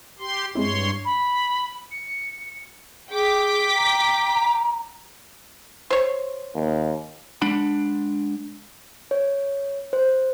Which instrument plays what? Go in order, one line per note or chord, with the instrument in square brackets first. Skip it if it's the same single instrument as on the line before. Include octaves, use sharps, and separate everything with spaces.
[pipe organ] G4 C6
[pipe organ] G2 C#5 C6 [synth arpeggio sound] G#3 C4 E4
[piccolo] B5
C#7
[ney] G#4 [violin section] G5 D6 B6
[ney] A#5
[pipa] C5 C#5
[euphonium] D#2
[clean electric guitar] G#3 D4 F#5 B5
[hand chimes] C#5
C5